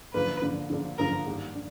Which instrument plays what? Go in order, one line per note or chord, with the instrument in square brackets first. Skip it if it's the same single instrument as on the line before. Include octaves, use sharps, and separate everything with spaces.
[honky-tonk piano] D3 F3 A#3 D4 [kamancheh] B4
[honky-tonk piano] D3 F3 A#3 D4
D3 F3 A#3 D4
[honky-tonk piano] D3 F3 A#3 D4 [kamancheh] A#4
[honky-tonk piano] D#3 G3 A#3 D4
D4